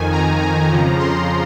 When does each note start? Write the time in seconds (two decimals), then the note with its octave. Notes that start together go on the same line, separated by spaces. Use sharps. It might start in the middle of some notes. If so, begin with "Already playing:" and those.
Already playing: F2 D#3 G#5
0.12 A#5
0.41 A#5
0.70 F2 C#3 F3
0.99 C6